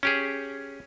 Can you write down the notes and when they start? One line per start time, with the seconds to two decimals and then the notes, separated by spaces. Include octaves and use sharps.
0.03 C#4 G4 G#4